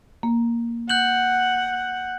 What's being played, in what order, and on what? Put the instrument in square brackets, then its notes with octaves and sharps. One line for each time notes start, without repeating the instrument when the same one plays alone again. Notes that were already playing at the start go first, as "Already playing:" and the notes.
[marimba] A#3
[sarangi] F#5 [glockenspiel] F#6 G6 F#7